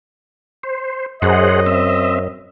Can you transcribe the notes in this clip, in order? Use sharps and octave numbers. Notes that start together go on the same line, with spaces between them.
C5
F#2 G#4 C5 D#5 F#5
C4 E5